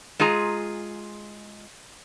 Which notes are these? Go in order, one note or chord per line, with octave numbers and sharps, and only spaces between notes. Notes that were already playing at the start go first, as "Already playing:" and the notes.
G#3 F4 G#4 A#5